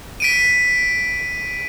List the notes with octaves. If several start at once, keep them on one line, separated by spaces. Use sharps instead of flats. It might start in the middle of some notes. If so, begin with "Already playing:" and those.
B6 D7 D#7